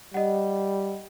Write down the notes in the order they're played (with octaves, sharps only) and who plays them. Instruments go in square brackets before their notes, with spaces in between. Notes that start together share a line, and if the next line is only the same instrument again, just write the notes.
[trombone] G3 [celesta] D#5 F#5